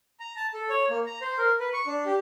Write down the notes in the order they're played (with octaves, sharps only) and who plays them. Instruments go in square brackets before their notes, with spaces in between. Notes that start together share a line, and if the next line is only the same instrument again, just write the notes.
[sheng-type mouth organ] A#5
A5
A4
C#5
A#3
A#5
C5
A#4
B4
C#6
D4
G4